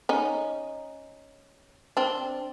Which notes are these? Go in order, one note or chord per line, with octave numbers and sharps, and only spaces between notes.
C#4 D#4
C4 D4